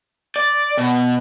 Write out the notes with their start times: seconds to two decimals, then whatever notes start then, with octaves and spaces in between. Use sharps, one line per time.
0.36 D5
0.77 B2